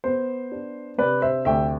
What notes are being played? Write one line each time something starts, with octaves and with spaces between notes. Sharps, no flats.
B3 C5
D4
C3 B4 D5
C5 E5
D2 E5 G5